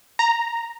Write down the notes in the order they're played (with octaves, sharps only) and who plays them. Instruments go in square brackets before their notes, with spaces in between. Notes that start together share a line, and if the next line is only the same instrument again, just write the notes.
[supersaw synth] A#5